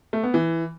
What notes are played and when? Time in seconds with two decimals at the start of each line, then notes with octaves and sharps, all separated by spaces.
0.13 A3
0.23 B3
0.34 E3